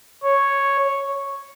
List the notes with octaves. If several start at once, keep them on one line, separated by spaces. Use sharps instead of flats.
C#5